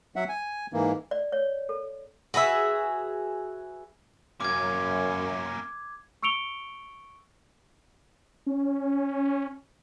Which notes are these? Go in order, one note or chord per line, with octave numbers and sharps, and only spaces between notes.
F#3 E5 F#5
G#5
G#2 E3 A#3
D5
C#5
A4
F#4 G#4 B4 E5
F#2 A#3 C#4 D6 G#6
C#6 E6 C#7 D7 F7 G7
C#4